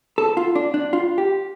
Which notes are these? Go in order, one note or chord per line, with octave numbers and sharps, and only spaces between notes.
A4
F4
D4
D4
F4
G4